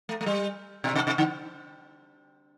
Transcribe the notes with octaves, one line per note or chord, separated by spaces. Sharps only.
A3
A3
G3
B2
C3
C3
D3